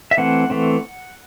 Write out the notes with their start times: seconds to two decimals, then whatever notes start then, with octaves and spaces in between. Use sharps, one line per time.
0.11 E5
0.17 E3 A3 C4 F#5
0.50 E3 A3 C4